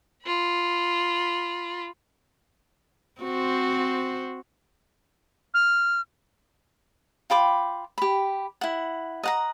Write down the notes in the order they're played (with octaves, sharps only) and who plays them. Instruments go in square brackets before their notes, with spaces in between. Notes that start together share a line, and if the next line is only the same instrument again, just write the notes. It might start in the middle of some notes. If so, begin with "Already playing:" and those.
[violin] F4 B5
[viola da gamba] C4 F#4 C5
[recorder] F6
[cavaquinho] F4 G5 B5 D6
G4 B5
E4 F#5
D#5 F#5 A#5